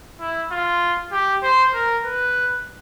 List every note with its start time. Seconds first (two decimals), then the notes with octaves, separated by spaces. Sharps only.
0.21 E4
0.51 F4
1.12 G4
1.43 C5
1.74 A#4
2.05 B4